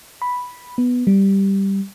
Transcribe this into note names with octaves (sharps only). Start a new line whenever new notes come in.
B5
B3
G3